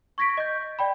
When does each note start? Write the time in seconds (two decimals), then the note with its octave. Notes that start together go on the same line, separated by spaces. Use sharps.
0.18 C#6 G#6 A#6 B6 D7
0.37 D#5 G6
0.79 D5 G5 B5